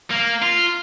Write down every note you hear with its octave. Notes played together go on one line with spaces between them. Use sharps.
A#3
F4